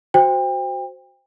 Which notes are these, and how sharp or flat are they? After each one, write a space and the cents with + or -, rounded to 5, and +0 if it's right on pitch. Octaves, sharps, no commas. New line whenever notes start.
F#4 +0 C5 -5 G5 +30